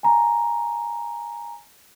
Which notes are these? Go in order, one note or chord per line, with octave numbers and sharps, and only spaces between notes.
G#5 A#5